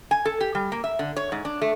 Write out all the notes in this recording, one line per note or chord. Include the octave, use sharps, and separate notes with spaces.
G#5
A4
G4
G3
A#3
E5
D3
C#5
G#2
D4
A3